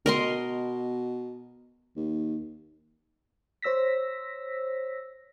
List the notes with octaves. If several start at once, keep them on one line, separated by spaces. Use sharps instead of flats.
B2 A#4 D#5 C6
D#2
C5 C#5 E6 A#6 B6